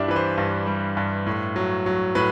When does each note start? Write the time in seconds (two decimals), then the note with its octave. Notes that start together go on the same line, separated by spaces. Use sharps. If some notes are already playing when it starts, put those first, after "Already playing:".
Already playing: G2 G3 D4 E4 G4 D5 E5
0.08 E3 B4
0.16 C5
0.37 G2
0.67 G3
0.97 G2
1.27 A2
1.56 F#3
1.86 F#3
2.15 A2 B4